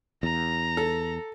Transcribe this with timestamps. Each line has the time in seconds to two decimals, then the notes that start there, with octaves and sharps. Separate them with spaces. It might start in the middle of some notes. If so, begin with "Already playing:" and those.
0.23 E2 A#5
0.77 A4